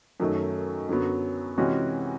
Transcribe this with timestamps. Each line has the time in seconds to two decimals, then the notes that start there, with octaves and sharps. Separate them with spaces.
0.20 F#2 D#3 F#3 A3
0.89 F#2 D3 F#3 B3
1.58 C3 E3 G#3 C#4 F#4